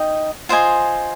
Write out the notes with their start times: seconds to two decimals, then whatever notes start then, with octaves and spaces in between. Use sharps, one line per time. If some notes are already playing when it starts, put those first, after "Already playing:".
Already playing: D#4 D#5 G5
0.49 F4 C5 D#5 G#5